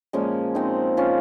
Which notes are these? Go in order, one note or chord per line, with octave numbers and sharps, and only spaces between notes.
A#2 F3 G#3 A#3 C#4
C4 D#4
C#4 F4